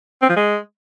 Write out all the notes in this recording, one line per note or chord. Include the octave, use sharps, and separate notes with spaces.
C4
F3
G#3